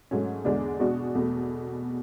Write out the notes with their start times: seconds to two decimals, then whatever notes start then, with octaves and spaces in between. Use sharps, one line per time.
0.11 G#2 F#3 A3 C#4
0.45 E2 D3 G#3 D4
0.80 B2 G#3 D4 F#4
1.15 E2 B2 A3